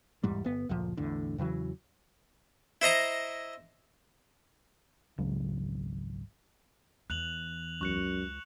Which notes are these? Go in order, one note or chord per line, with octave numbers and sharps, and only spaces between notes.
D1 E2 G#2 G3
G1 B3
F#1 D2 A#2 F3
A1 E2 A2 D3
E2 C#3 E3 F#3
E4 C5 D#5 A#5
G#1 C#2 C#3 F#3
E2 F#6 F7 F#7
C#2 F#2 C#6 F#6 C#7